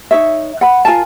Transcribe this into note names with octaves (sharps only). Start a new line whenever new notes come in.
D#4 C#5 E5
F#5 B5
F4 A#4 G#5 A5